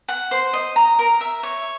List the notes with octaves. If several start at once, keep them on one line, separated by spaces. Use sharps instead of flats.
F#5
C5
D#5
A#5
A#4
E5
C#5